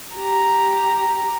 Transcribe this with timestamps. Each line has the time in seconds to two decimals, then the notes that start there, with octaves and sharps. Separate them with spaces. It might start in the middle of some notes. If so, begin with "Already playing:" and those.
0.15 G4 A#5